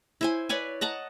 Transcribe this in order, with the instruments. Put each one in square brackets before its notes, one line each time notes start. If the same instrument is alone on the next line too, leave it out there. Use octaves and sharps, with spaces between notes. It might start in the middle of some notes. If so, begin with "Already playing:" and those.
[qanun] E4 C5 G#5
B4 C#5 D5 G#5
D#5 F#5 A5 A#5